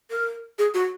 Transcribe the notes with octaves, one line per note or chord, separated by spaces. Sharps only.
A#4
G#4
F#4